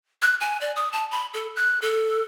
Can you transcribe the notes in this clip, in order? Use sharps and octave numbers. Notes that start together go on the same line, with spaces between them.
F#6
G#5
D5
D#6
A5
B5
A4
F#6
A4